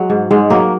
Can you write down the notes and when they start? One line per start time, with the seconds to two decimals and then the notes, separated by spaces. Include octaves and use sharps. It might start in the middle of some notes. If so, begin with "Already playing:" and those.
Already playing: F#3 G#3
0.10 G#2
0.31 G#2 G#3
0.50 F#3 A#3